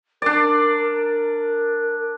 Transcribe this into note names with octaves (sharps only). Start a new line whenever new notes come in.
D4 A#4 D5